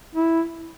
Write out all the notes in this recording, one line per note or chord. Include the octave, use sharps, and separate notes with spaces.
E4